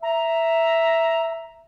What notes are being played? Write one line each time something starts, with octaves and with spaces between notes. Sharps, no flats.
E5 A#5